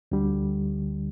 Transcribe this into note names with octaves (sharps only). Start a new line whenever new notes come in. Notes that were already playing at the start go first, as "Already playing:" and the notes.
D2 D3 G3